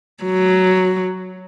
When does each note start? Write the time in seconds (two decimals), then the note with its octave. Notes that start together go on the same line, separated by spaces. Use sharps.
0.24 F#3